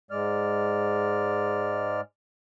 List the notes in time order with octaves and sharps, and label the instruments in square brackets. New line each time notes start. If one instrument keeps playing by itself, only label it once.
[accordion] G#2 G#3 D5 F6